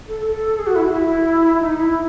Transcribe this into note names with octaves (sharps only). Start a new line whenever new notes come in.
A4
A4
G#4
F#4
E4
F#4
E4
D#4
E4